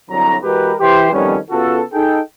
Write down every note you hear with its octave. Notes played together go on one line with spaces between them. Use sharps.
C2 D3 F#3 A#5
E3 G#3 F#4 G4 A#4 B4
E3 G4 C5
F2 D#3 G3 B3 C#4
C#3 B3 F4 F#4 A4
D#4 G#4 A4 G5